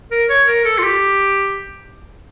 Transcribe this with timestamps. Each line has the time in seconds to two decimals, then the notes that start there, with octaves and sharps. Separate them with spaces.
0.11 A#4
0.29 C#5
0.47 A#4
0.65 A4
0.78 F4
0.84 G4